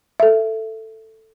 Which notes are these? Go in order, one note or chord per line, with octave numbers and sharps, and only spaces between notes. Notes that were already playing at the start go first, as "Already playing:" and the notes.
A4 E5